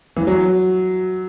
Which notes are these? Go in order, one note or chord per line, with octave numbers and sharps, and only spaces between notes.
E3
F#3